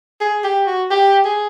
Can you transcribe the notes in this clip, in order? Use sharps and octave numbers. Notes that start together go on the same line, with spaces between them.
G#4
G4
F#4
G4
G#4